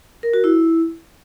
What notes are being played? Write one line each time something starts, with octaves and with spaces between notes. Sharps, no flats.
A#4
F#4
E4